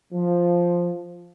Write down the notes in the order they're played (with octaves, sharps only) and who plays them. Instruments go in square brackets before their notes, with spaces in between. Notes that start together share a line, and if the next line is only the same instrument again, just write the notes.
[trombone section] F3